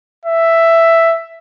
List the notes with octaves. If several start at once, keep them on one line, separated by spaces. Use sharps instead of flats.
E5